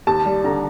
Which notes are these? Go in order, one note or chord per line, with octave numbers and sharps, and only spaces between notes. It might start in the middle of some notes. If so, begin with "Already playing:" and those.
D#2 A5
G3
D3 A#5